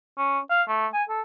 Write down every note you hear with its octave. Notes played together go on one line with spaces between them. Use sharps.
C#4
F5
A3
G#5
A4